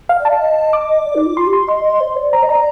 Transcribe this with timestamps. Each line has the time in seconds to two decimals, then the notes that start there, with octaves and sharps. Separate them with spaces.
0.09 F5
0.20 D5
0.25 A5
0.30 F5
0.41 D#5
0.73 D6
1.05 D5
1.15 D#4
1.26 F4
1.37 F4 C6
1.47 G4
1.53 C6
1.68 D#5 C6
1.84 D#5
2.00 C5
2.16 D5
2.32 C5 A#5
2.43 D#5
2.48 D5 A#5